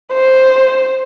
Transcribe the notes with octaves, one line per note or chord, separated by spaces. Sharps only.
C5